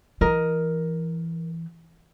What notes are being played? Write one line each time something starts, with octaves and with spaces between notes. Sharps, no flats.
E3 A#4 D#5